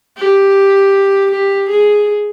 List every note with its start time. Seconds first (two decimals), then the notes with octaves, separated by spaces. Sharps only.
0.17 G4
1.31 G4
1.70 G#4